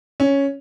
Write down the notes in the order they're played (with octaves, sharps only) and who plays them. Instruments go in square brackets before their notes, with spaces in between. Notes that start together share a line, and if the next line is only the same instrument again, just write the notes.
[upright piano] C#4